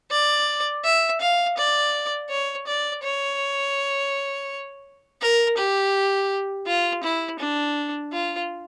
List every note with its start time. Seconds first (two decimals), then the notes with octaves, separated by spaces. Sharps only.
0.11 D5
0.84 E5
1.21 F5
1.57 D5
2.30 C#5
2.67 D5
3.03 C#5
5.22 A#4
5.58 G4
6.67 F4
7.04 E4
7.40 D4
8.13 F4